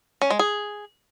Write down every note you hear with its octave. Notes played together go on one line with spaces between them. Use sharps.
C#4
G#3
G#4